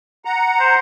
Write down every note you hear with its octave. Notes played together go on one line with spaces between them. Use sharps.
F#5 A#5
C5